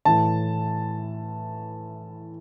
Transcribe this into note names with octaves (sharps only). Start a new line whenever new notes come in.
A2 E3 A5